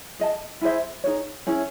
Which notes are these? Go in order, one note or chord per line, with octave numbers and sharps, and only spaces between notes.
G#4 D#5 A5
E4 G#4 C5 E5
D#4 G#4 C#5
C#4 E4 G#4 C#5